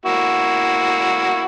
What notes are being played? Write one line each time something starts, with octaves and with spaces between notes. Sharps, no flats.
A#3 E4 F#4